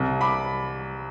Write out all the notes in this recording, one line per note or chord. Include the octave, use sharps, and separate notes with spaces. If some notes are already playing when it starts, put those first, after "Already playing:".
Already playing: C2
B5 D6